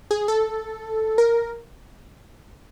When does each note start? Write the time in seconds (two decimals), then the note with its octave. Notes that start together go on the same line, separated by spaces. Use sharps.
0.11 G#4
0.28 A4
1.18 A#4